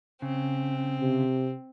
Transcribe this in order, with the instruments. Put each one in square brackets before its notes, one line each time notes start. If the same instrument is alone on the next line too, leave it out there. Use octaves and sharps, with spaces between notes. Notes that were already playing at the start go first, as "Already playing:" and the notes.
[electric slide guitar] C#3 [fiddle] C4
[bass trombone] C3